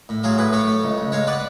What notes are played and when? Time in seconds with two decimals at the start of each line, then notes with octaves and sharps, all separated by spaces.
0.09 A2
0.23 F#3 F4 G#4
0.38 A2 G#4 B4
0.53 A3 A4 C#5
0.67 A3
0.84 C#2
0.98 C#2
1.12 G#3 C#5 F5
1.27 B3 B4 D5